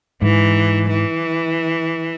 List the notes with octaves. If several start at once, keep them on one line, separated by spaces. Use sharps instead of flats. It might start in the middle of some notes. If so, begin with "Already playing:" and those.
G#2 E3
E3